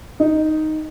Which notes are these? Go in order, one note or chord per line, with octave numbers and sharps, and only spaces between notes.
D#4